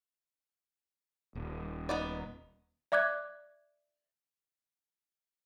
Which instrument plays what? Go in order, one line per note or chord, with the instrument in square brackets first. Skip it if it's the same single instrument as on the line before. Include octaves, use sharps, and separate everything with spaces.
[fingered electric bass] D#1
[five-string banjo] B3 D#4 D5
[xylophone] D5 E5 D6 F#6 G#6